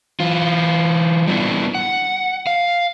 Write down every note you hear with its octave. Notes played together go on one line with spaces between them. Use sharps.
E3 F4
G3 B3 D4 E4
F#5
F5